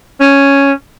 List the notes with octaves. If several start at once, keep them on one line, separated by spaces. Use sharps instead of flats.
C#4